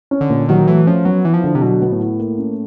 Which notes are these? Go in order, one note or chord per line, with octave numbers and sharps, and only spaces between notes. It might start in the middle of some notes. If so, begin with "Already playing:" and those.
C#4
D3
A#2
D#3 F#3
E3 A3
F3 C#4
F#3 B3
E3 E4
F3
D3
C3
B2 F#3
B3
A2
E4
A#3
C#4